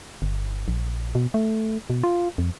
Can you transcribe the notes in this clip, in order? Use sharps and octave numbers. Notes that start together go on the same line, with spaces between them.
G1
A#1
B2
A3
B2
F4
F2